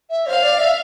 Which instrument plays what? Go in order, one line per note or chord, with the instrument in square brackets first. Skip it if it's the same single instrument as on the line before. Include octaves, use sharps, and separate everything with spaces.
[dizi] E5
[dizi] C5 [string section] F5
[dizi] D5
E5